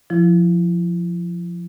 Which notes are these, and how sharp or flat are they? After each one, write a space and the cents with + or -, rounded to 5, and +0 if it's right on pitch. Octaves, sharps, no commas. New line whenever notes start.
F3 +0 E4 +20